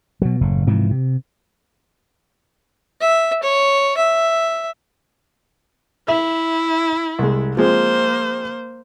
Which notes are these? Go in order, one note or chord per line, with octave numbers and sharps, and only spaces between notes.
B2 F#3
F#1 A2
G#2 C3 E3 F3
C3
E5
C#5
E5
E4 E5
C2 G#3
F3 G#3 A#3 C4 C5